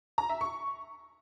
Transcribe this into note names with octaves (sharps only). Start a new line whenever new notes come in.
A#5
E5
C#6